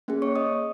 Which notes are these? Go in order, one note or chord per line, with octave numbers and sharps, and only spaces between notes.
A#3 C#4 G#4
C#5 C#6
D#5 D#6